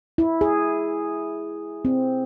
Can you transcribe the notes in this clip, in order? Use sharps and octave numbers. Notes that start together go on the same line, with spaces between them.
E4
G#4
C4